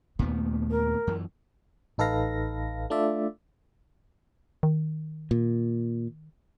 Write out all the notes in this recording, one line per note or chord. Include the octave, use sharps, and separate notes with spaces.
D#2 A#2 D#3 A3 B3
A#4
F#2 E3
A1 D#4 A4 B4 F5 A#6
A3 D4 F4 D5 E5
D#3
A#2